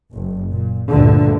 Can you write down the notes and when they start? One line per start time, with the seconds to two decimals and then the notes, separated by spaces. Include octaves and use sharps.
0.13 F#1
0.52 A#2
0.89 D2 G2 A#2 D3